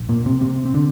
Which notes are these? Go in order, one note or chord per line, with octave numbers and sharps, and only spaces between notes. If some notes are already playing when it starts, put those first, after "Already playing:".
Already playing: A#1
A#2 A#3
C3 C4
C3 C4
C4
D3 D4